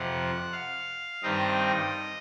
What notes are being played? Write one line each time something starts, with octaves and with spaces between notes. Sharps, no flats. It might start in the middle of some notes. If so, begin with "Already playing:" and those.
Already playing: F2 C3 F3 F#5
F5
G2 D#3 G3 C4 D#4 D#5